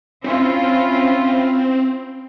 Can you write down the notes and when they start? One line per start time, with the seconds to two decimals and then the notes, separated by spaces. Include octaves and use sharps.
0.24 C4 C#4 E4 F4